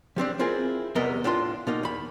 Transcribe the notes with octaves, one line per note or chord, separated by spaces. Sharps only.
F3 G3 C4 D4
C4 E4 F4 G#4 A#4
E2 C3 G3 B3 A#4 D#5
A2 D4 F4 C6
B2 A#3 D#4
E2 B5